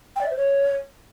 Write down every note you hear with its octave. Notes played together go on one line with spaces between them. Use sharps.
G5
D5
E5
C5
C#5